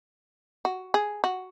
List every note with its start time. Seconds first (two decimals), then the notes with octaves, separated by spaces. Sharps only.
0.65 F#4
0.94 G#4
1.24 F#4